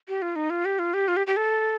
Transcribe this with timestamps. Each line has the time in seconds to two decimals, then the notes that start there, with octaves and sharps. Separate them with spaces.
0.08 G4
0.22 F4
0.36 D#4
0.50 F4
0.65 G4
0.79 F4
0.94 G4
1.08 F4
1.17 G4
1.27 G4
1.37 A4